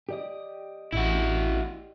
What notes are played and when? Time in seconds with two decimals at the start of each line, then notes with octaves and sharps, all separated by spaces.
0.09 G4 D5 D#5
0.93 A1 E4 F#4